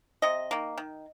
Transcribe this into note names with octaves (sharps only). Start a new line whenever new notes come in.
C3 D#5
D#3 A#3
D#3